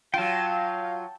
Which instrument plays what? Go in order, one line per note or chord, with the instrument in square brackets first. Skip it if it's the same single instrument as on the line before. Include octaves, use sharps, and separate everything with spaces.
[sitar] F#3 F4 [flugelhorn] F5 [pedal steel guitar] G5 A5